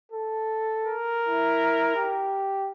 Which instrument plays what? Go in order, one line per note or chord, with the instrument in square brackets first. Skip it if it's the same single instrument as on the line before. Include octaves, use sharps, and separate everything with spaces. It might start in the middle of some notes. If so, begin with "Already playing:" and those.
[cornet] A4
[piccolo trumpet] A#4
[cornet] E4
G4